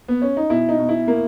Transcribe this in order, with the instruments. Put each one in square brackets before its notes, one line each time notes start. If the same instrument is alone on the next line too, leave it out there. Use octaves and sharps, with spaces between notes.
[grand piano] B3
C#4
D#4
[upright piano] B2 [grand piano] E4
[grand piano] D#4
[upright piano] B2
[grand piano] E4
[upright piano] A#3